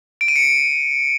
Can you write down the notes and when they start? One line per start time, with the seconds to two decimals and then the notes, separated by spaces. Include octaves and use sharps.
0.21 D7
0.28 D#7
0.36 C#7